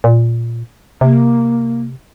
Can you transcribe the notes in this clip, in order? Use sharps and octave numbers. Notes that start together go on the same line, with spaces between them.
A#2
C3 A#3